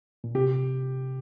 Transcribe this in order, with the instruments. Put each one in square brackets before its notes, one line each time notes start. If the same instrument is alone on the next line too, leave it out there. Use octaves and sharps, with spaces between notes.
[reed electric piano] A#2
[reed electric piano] C3 [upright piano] G4